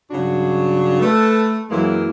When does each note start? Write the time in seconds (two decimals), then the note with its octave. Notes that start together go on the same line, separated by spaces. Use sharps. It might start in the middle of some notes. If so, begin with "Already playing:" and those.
0.11 G2 C#3 F#3 D4 F#4
1.00 A3 A4 B4
1.70 F#2 E3 F#3 G#3 A#3 E4